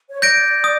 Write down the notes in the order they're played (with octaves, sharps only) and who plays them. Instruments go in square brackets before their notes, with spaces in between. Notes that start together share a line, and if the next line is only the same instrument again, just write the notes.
[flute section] C#5
[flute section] D5 [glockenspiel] G6 A#6 D7
[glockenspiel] D#6